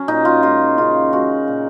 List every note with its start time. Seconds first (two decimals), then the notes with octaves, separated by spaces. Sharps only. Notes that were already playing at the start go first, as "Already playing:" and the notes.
Already playing: F#3 C#4
0.08 A#2 D#4
0.25 F4
0.43 G#3 F4
0.78 C#3 F4
1.12 G#3 F#4
1.48 A#2